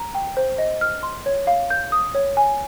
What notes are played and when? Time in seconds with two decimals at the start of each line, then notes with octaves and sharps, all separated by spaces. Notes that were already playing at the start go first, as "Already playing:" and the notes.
Already playing: A#5
0.15 G5
0.37 C5
0.58 D#5
0.81 F6
1.03 C6
1.26 C#5
1.47 F5
1.70 G6
1.92 D#6
2.15 C#5
2.37 G#5